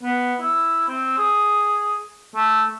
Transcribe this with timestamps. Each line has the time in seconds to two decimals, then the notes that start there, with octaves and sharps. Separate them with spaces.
0.03 B3
0.40 E4
0.88 C4
1.18 G#4
2.35 A3